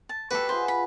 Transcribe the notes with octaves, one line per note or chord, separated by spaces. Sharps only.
A5
F#4 G4 A4 B4 E5 G5
F4 G#4 C5 F#5
B5